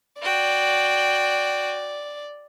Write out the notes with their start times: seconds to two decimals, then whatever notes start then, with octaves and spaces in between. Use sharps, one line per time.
0.22 F#4 D5 G5